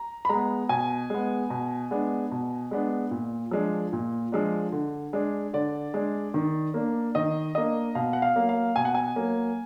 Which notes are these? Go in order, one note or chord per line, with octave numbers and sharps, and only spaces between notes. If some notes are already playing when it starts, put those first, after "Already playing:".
Already playing: A#5
B5
G#3 B3 A#5
B2 G#5
G#3 B3
B2
G#3 B3 D4
B2
G#3 B3 D4
A#2
F3 G#3 D4
A#2
F3 G#3 D4
D3
G#3 D4
D3 D5
G#3 D4
D#3
A#3 D4
D#3 D#5
A#3 D4 D#5
B2 F5
F#5
F5
F#3 A#3
F5
B2 G#5
F#5
G#5
F#3 A#3